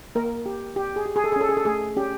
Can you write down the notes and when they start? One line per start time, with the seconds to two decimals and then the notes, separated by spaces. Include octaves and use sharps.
0.15 A#3 A#4
0.46 G4
0.76 G4
0.96 G#4
1.06 G4
1.16 G#4
1.24 A4
1.32 G#4
1.36 C#4 A4
1.49 G#4
1.57 A4
1.65 A3 G#4
1.96 C#4 G4